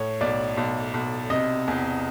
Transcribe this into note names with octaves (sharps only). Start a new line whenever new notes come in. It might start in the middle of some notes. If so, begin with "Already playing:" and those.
Already playing: A2 C#5
B1 D5
B1
B1
C3 D#5
E2